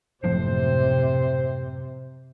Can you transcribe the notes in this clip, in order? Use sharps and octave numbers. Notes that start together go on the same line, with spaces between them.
F#1 A2 C3 F3 C5